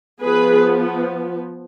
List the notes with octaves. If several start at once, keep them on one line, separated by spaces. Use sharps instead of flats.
F3 B3 G#4 B4